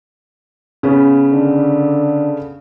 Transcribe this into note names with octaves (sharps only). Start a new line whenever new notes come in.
C#3 B3 C#4
D3